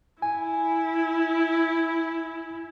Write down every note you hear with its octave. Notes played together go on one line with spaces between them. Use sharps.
E4 G#5